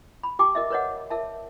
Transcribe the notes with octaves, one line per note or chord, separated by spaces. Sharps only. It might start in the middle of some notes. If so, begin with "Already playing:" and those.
B5
G4 G5 A5 D6
A#4 D#5 E5
A#4 B4 C#5 D#5 F#5
A#4 E5 A5